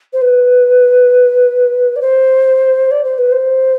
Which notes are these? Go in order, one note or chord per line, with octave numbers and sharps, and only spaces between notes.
C5
B4
D5
C5
D5
C5
B4
C5